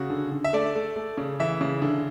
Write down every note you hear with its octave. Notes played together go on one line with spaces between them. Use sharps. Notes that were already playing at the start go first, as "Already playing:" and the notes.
Already playing: C#3 F#4
D3
D3
E5
A3 D5
A3
A3
C#3
E3 E5
C#3
D3